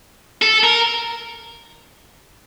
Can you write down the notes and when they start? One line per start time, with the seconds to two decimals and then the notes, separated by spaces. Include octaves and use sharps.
0.42 A4
0.64 A#4